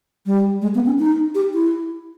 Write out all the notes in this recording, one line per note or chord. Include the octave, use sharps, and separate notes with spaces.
G3
G#3
B3
C#4
D#4
G4
E4